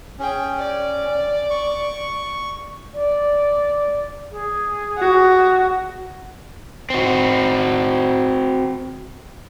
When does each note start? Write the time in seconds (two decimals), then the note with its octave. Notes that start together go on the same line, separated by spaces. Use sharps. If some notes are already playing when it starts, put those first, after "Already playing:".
0.19 C#4 G#4 G5
0.58 D5
1.50 C#6
2.94 D5
4.32 G#4
4.98 F#4
6.90 C4 F#4